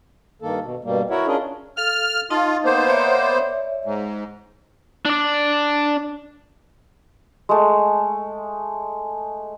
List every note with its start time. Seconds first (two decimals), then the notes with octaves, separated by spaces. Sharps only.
0.42 G2 D#3 A#3 A4
0.61 B2
0.84 G2 B2 G3 A#3
1.10 E4 F#4 A#4 C#5 E5 F#5
1.27 C#4 D4 F4 G#4 A#4 D#5
1.77 A4 F5 F6
2.30 D#4 F4 D#5 A5
2.65 A#3 B3 C5
2.89 C#5 D5 E5
3.85 G#2
5.05 D4 D5
7.49 G#3 A3